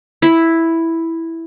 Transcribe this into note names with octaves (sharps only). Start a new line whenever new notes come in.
E4